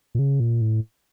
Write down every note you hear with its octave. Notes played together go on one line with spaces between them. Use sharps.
A#2
C#3
A#2
A2